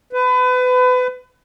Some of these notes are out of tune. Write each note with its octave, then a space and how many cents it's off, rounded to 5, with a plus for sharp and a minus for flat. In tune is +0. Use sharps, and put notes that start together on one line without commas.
B4 +30